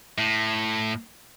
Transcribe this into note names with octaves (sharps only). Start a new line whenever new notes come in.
A2